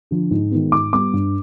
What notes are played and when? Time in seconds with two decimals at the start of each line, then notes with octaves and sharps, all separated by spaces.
0.11 D3 F3
0.31 G#2
0.51 D#3 G#3 B3
0.72 G#2 D6
0.93 G3 B3 D6
1.13 G2